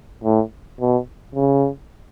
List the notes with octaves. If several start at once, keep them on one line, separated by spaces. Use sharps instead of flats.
A2
B2
C#3